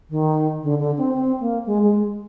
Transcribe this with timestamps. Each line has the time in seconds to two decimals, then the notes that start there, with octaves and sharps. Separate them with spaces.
0.10 D#3
0.63 D3
0.79 D3
0.98 C4
1.14 C4
1.40 A#3
1.66 G#3
1.84 G#3